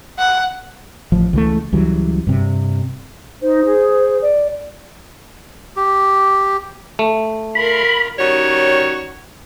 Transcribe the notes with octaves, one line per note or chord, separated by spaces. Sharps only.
F#5
A1 F3
C#2 E3 F#3 A3
C#2 E3 F#3 G3
G2 C3
D#4 C5
G#4
D5
G4
A3
F4 A#4 B5
D#3 G3 C#4 F#4 C#5